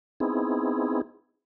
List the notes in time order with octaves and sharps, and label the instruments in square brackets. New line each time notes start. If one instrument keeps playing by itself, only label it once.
[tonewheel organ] B3 C4 D#4 E4 G#4